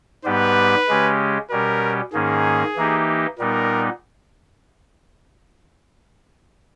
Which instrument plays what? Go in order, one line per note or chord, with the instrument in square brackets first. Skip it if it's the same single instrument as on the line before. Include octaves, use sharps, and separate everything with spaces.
[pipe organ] G#2 G3 B3 G4 [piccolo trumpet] B4
[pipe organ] C#3 G#3 C#4 G4
[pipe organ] B2 G3 C#4 G4 [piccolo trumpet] A#4
[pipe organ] G#2 D#3 A#3 C#4 [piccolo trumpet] G#4
[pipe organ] E3 A#3 D#4 G4
[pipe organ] A#2 G3 B3 D#4 [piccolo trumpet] A#4